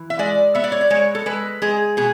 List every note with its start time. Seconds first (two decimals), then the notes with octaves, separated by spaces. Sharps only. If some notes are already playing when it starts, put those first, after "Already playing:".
Already playing: E3
0.10 E5
0.19 G#3 D5
0.55 B3 E5
0.64 D5
0.72 C#5
0.81 D5
0.90 G#3 C#5
1.15 A4
1.26 G#3 B4
1.62 G#3 G#4
1.97 B2 G#4